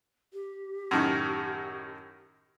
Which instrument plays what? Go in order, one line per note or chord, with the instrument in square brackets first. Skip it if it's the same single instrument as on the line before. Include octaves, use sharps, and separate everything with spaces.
[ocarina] G4
[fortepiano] F#2 A2 D#3